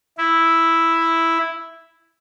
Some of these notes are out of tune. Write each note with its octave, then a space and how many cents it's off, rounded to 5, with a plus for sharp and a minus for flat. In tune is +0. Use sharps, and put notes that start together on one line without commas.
E4 +0